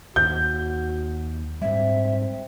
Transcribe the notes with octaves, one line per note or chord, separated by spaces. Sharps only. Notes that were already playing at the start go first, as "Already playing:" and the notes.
D#2 F#4 G6
G#2 G3 C4 E5